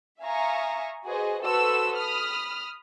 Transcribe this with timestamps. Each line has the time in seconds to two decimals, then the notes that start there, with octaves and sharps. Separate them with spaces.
0.22 E5 F5 G#5 A#5 C#6 D#6
1.05 F#4 G#4 B4 C5 D#5
1.42 F#4 A4 B4 C5 C6 E6
1.96 B5 D#6 F6